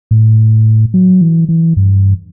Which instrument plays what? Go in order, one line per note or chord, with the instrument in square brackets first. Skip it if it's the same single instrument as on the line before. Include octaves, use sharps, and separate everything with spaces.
[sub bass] A2
F#3
E3
E3
G2